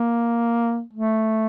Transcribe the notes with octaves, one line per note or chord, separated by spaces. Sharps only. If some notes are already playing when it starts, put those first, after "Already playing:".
Already playing: A#3
A3